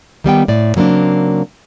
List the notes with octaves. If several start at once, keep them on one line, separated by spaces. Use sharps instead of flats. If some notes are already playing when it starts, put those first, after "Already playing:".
D#3 G3 B3 G5
A2 D5
C#3 F#3 A#3 C4 D4